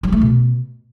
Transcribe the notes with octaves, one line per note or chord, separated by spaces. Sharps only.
F#3
A3
B2